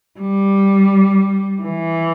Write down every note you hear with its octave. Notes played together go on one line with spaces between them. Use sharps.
G3
E3